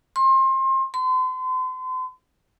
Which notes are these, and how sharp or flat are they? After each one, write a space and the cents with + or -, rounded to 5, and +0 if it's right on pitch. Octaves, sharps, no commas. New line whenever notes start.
C6 +30
C6 -40